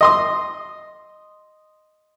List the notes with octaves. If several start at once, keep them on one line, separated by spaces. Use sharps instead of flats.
D#5 C6 D#6